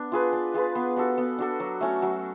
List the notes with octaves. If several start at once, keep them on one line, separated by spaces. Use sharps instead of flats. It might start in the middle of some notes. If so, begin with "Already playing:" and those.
Already playing: B3 D4
F4 G#4 B4
D4
F4 G#4 B4
B3
D4 F#4 A4
B3
D4 F#4 A4
F#3
A3 C#4 F#4
F#3